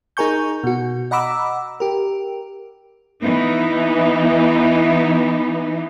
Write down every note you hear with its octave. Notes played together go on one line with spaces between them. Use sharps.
D#4 G#4 A#4 G#5 C#6 G6
B2 F#4
D#5 F#5 A#5 B5 D6 E6
G4 A#4
E3 B3 D#4